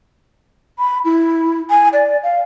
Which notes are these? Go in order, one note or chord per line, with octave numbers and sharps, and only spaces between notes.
B5
E4
G#5
D5
F5